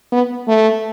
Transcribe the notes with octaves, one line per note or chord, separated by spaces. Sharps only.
B3
A3